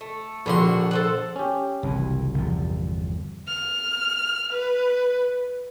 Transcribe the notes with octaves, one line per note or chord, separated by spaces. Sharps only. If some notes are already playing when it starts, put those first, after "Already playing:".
A3
A#1 A2 D3 F#4 C6
A4 C5 F#5
C#4 G4
F#1 C2 C#3 E3
G1 E2 F3
F6
B4